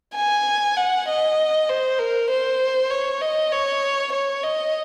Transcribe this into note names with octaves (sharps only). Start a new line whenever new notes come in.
G#5
F#5
D#5
C5
A#4
C5
C#5
D#5
C#5
C#5
D#5